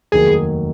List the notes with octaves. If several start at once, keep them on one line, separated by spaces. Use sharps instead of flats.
F1 D#2 D#3 F#3 A#3 G#4